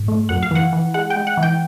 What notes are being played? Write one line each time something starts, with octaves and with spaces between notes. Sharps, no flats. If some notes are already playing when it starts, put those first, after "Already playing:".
Already playing: G#2
A3
F#2 F#5
F5
E3 F#5
E3
G#3 F#5
G5
G#3
F#5
E3
G5